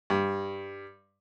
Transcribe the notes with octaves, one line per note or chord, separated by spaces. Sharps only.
G2